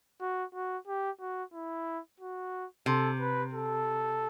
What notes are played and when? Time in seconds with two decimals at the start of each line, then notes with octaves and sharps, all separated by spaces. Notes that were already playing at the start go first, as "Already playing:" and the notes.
0.21 F#4
0.54 F#4
0.87 G4
1.20 F#4
1.53 E4
2.20 F#4
2.86 C3 A4
3.20 B4
3.54 A4